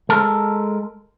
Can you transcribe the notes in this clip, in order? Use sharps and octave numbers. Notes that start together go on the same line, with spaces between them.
G#3 A4 A#4